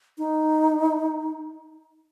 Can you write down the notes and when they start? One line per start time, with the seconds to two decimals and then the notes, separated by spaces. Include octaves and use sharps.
0.18 D#4